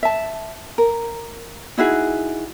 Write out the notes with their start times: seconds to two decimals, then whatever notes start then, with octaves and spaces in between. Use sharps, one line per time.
0.03 E5 A5
0.78 A#4
1.77 D#4 E4 F#4 G#4